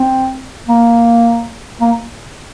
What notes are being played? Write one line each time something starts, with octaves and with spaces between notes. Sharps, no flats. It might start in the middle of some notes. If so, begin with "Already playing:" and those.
Already playing: C4
A#3
A#3